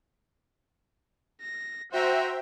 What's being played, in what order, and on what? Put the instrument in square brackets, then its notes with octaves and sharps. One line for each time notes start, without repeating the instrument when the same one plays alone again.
[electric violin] A#6
[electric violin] F#4 A#5 [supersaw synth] C5 E5 G5